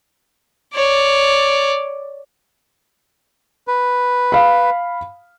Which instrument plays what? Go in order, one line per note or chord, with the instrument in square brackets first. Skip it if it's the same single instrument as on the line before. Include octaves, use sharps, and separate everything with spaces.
[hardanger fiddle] C#5 D5
[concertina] B4
[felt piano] F5 B5